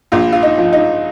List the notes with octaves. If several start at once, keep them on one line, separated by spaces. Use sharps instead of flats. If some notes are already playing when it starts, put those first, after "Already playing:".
A#1 F4
F4
D#4
F3
D#4